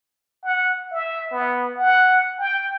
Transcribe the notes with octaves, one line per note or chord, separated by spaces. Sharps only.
F#5
E5
B3
F#5
G5